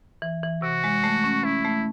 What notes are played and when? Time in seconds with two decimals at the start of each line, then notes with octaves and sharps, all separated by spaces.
0.22 E3
0.43 E3
0.62 C3 F#4
0.84 G#3
1.04 A3
1.24 C#4
1.43 C#4 E4
1.65 A3